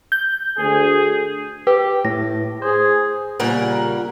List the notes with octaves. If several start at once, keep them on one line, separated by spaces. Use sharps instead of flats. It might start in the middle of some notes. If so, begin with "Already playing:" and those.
G6
D2 G#4
G4 B4
A2 A#6
G#4 C5
A#2 C#3 G3 A#4 F#5